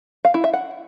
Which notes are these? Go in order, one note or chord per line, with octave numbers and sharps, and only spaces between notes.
F5
E4
E5
F#5